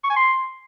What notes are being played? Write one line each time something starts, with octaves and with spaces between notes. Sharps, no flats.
C#6
G#5
C6